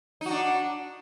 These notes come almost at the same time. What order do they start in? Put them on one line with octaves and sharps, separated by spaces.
D#4 F#4 D4